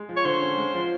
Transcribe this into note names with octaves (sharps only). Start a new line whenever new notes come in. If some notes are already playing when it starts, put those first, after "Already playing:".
Already playing: G#3
F3
C#5
D3 C5
C#4
G#3
F3